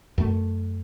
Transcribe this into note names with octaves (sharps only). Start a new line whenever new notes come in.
F#2 A3